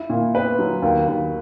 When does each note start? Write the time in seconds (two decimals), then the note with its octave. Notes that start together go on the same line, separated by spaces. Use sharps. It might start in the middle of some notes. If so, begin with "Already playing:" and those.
Already playing: E4
0.10 A#2
0.34 B3 B4
0.59 F#3
0.82 D#2
1.08 D#2